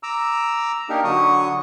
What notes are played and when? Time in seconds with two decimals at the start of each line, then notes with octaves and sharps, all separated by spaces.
0.03 A#5 D6 E6
0.89 A#3 D4 D#4 G4 A#4
1.04 D3 F#3 C#6 D#6